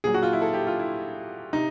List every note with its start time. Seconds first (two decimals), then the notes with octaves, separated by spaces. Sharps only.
0.04 A#2 F#3 G#4
0.14 F#4
0.23 F4
0.33 E4
0.42 A4
0.53 G4
0.67 F4
0.79 E4
1.53 C3 D#4